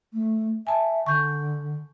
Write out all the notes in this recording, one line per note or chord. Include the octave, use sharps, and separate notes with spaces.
A3
E5 G#5 A5
D3 C#6 G6